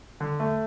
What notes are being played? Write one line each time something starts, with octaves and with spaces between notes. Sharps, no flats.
D3
A3